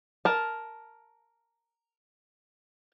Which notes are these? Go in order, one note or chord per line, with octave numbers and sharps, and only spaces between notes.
A#4 A5